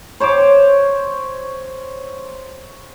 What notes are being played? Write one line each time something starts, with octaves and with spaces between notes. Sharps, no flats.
C5 C#5 C6 D6